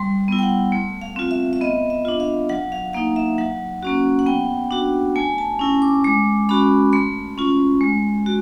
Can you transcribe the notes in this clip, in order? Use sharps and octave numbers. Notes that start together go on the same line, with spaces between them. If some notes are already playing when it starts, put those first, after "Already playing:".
Already playing: G3 C6
B3 E4
G5
F#5
A3
F5
C4 F4
E5
E5
B3 D#5
E5
D4 F4
F5
F#3 F#5
F5
A#3 D#4 F5
E5
F#3 F#5
A#3 C#4 F#4
F#5
B3 G5
D4 F#4
A3 G#5
A5
C#4 E4
D6
G#3 D6
C#4 F#4 B5
A3 C6
C#4 F4
G#3
F#4